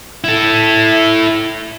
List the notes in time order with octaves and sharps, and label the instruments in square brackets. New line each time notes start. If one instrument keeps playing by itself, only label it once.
[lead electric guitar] E4 A4